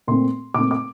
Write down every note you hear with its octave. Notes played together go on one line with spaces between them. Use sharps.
A#2 A3 C4 C6
A#2 A3 C4 D6
D6